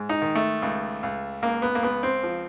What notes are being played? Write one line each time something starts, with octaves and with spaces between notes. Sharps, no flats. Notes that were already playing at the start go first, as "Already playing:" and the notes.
Already playing: G#2
D#4
D#3
A3
C#2
C#2
C#2 A#3
B3
A#3
C#2 B3
C4
F3